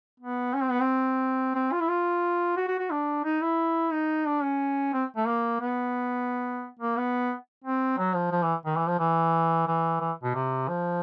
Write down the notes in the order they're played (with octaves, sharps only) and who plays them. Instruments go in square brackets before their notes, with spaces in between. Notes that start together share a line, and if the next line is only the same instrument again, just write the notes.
[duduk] B3
C#4
C4
B3
C4
C4
F4
E4
F4
F#4
F#4
F#4
D4
D#4
E4
D#4
D4
C#4
C4
A3
A#3
B3
A#3
B3
C4
F#3
F3
F3
E3
D#3
E3
F3
E3
E3
E3
B2
C3
F3